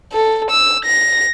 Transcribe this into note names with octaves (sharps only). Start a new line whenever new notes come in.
A4
E6
A#6